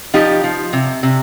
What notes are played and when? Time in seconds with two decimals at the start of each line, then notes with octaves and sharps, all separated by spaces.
0.14 F3 D#4 G4
0.44 F3
0.73 C3
1.03 C3